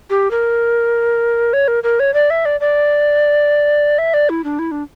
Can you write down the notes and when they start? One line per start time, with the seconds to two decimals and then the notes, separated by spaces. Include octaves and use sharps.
0.10 G4
0.31 A#4
1.53 C#5
1.68 A#4
1.83 A#4
2.00 C#5
2.14 D5
2.30 E5
2.45 D5
2.60 D5
3.98 E5
4.14 D5
4.29 E4
4.44 D4
4.59 E4
4.71 D4